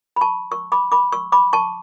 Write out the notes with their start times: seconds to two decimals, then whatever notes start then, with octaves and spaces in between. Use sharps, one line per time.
0.16 B5
0.21 A5 C#6
0.52 C#6 E6
0.72 B5 D6
0.92 B5 D6
1.12 C#6 E6
1.32 B5 D6
1.53 A5 C#6